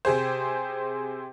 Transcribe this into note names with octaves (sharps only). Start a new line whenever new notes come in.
C3 G4 G#4 C5